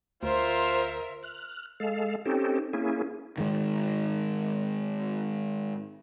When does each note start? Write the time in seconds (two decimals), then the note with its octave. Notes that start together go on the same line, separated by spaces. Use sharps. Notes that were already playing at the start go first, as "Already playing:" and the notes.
0.23 D2 F4 A#4 C5 E5
1.23 F6 F#6
1.80 G#3 A4 F5
2.26 C4 C#4 D#4 G4 A4
2.73 A#3 C#4 E4 G#4
3.38 G#2 D#3